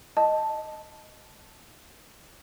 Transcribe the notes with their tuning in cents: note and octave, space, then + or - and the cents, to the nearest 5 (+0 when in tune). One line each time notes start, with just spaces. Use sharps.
D#5 +0 A5 +0